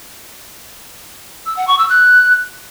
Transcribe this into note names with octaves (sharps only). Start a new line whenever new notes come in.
E6
F#5
C#6
E6
F#6